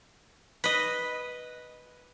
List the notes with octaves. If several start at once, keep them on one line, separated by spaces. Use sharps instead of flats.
B4 D#5